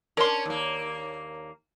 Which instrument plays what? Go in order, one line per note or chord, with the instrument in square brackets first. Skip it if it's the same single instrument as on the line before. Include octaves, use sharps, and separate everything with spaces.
[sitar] C#4 D4 [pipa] A#4 C6
[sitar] D#2 A#3